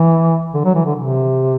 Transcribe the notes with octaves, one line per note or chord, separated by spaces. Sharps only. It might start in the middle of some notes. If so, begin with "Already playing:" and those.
Already playing: E3
D3
F#3
E3
D3
C3